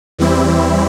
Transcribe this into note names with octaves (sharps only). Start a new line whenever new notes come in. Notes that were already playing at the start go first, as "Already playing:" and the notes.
E2 E3 G3 C4 E4